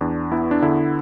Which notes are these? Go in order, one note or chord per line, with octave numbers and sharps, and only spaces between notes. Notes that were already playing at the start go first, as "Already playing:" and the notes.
E2 D4
B3 E4
D4
D3 E4